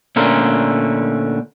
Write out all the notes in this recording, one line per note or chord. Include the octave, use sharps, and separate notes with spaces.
A#2 D3 A3 C#4 A#4 C5